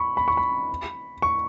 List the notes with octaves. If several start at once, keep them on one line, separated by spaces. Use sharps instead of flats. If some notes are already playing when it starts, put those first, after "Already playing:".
Already playing: B5 C#6
B5
C#6
B5
C#6